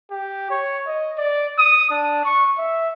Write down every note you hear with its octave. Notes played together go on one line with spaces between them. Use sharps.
G4
C#5
D#5
D5
D#6
D4
C#6
E5